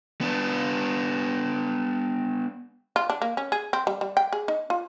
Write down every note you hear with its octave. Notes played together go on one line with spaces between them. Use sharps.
B3 D4
F4
D4
A#3
C#4
G#4
C4
G3
G3
G5
G#4
D#4
F4